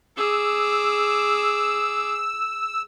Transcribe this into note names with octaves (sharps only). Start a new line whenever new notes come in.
G#4 D6 E6